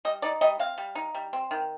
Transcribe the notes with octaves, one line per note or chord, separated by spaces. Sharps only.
G3 D#5
D#4 D5
G3 D#5
C4 F5
G3
D#4
G3
C4
D#3